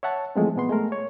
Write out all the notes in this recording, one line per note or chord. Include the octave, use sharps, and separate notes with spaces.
C#5 E5 F#5 A5
E3 F3 G#3 A3 C4
A#2 B3 C6
G#3 A3 A#4
C#5